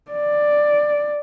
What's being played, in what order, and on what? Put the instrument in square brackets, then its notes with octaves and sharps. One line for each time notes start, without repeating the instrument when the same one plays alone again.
[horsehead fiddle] D5